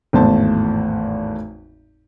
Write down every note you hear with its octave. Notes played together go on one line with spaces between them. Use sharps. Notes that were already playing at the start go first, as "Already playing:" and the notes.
G#1 E2 A2 C5 A5